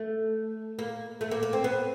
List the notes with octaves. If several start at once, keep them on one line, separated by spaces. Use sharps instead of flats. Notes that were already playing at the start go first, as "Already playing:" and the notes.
Already playing: A3
A#3
A3
A#3
A#3
C4
B3